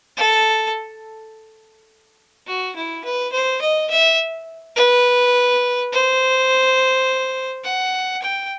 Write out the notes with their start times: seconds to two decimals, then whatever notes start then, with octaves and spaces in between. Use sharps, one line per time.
0.17 A4
2.47 F#4
2.76 E4
3.04 B4
3.32 C5
3.62 D#5
3.90 E5
4.76 B4
5.92 C5
7.64 F#5
8.22 G5